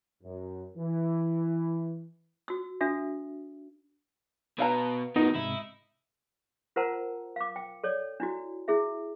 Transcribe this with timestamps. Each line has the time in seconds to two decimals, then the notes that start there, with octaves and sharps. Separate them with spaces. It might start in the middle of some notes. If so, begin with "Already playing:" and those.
0.23 F#2
0.76 E3
2.48 F#4 E6
2.81 D4 F#4 A4 E5
4.59 B2 B4 F5 A#5
5.16 C2 D#3 B3 D#4 F#4
5.35 G#2 C3 E4
6.76 F4 A#4 C5 F#5 A5 A#5
7.36 F5 D6
7.56 G5
7.84 A4 C#5 D5
8.20 D4 E4 F#4
8.68 E4 G#4 E5